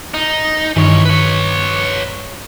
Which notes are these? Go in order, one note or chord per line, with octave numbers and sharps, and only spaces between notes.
D#4
G2 D#3 E3 D#4 C#5
B4 C#5